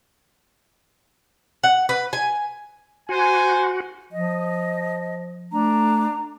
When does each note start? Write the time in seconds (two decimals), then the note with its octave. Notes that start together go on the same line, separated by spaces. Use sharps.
1.64 F#5
1.89 B4
2.13 G#5
3.09 F#4 C5 G#5
4.12 F3 D#5
5.52 A3 D4 A#5